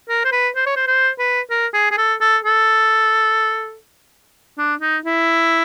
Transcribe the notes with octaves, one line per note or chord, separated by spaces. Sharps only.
A#4
C5
B4
C5
C#5
C5
C5
B4
A#4
G#4
G#4
A4
A4
A4
D4
D#4
E4